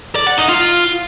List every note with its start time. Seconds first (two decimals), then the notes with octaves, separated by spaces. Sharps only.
0.15 D5
0.27 F#5
0.38 D#4
0.49 F4